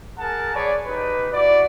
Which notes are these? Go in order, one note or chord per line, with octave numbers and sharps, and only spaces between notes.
G#4 A#4 F#5 G#5 A5
G#4 B4 C#5 D5
D#4 G4 B4
E4 F#4 D5